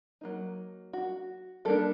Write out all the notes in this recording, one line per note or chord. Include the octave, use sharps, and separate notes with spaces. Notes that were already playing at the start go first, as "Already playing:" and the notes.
F#3 A#3 D#4
F#4
G3 A#3 D4 A4